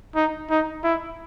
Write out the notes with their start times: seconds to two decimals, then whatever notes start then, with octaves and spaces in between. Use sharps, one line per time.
0.15 D#4
0.50 D#4
0.84 E4